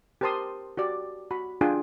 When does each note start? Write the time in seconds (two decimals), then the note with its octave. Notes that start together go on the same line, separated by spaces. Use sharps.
0.21 G4 A#4 C5 A5 C6 D#6
0.77 F#4 G4 D5
1.31 F#4 B5
1.61 D4 F4 G#4 G5 G#5